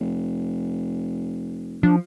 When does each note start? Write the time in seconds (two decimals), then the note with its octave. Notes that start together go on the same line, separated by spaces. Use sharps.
0.01 F1
1.83 F3 D4